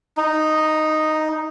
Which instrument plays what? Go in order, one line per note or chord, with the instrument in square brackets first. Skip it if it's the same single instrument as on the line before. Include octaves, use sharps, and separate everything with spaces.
[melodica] D#4